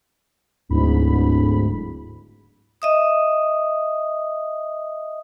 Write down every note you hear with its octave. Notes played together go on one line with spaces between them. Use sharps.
D1 D2 G#2 B5
D#5 E5 D#6